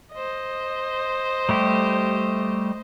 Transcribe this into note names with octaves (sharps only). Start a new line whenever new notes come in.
C5 D#5
G3 A3 G4